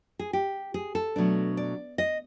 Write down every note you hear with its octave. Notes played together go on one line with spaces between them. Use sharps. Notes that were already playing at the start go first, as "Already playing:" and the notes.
G#4
G4
G#4
A4
B2 F#3 A3 D4
D5
D#5